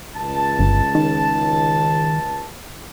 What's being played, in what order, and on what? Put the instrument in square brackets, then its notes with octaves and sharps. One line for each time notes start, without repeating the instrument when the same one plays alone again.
[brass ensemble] C#2 A5
[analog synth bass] G1
D#3